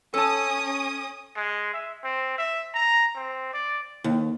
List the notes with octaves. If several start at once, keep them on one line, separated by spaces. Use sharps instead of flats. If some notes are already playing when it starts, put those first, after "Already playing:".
C#4 A4 A5 D#6
G#3
E5
C4
E5
A#5
C4
D5
D#2